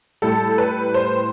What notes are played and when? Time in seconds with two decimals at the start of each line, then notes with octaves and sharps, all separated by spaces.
0.22 A2 G3 A4
0.58 B4
0.94 C5